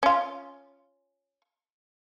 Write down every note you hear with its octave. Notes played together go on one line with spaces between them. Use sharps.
C#4 F4